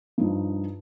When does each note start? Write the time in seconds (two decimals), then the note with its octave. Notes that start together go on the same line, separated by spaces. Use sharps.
0.18 G2 F3 D#4